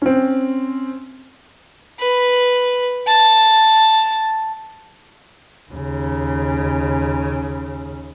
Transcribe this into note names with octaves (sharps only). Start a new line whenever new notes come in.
C4 C#4
B4
A5
D#2 C#3